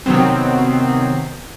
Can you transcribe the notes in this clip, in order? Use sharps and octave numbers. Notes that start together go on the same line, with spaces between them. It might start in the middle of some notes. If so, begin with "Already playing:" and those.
C3 D#3 F#3 B3 C4